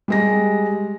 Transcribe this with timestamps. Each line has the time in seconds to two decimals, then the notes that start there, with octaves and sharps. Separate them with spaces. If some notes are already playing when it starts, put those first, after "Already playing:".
0.08 G3 G#3 A#6